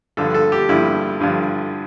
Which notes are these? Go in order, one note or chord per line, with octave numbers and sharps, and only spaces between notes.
G2 D3 F3 A4
A4
G4
G2 D3 F3 E4
G2 D3 F3